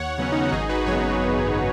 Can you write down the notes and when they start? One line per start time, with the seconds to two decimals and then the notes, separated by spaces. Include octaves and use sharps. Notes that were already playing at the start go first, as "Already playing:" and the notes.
Already playing: D#2 C#5 F#5
0.18 C#3 F#3 B3 C#4
0.32 D#4
0.42 F#4
0.52 G#1 D#4 G#4
0.69 F#4 B4
0.86 F#2 C#3 F#3 B3 G#4 C#5